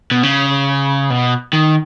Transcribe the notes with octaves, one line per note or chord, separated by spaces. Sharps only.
B2
C#3
B2
D#3